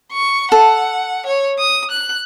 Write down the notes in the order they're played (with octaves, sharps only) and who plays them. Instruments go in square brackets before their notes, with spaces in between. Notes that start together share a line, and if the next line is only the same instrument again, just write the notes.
[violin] C#6
[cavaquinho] A4 [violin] F#5
[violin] C#5
D#6
F#6